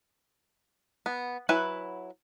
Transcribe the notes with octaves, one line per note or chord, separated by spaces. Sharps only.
B3
F#3 E4 B4 F#5 G#5